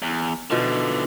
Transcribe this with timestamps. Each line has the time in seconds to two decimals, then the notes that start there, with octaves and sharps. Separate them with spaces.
0.02 E2
0.50 B2 D3 E3 F3 D#4